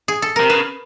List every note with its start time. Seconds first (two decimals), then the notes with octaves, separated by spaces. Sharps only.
0.08 G#4
0.22 A4
0.36 C3 A#4
0.50 C#3 B4